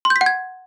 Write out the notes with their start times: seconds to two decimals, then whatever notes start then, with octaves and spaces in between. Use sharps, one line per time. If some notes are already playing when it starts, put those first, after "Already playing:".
0.05 C6
0.10 G6
0.16 B6
0.21 F#5
0.26 G#6